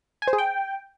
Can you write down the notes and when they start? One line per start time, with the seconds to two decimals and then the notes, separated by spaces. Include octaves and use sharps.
0.22 G#5
0.28 C5
0.33 G#4
0.38 G5